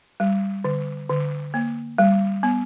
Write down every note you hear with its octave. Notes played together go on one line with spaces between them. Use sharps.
G3
D3
D3
A#3
G3
B3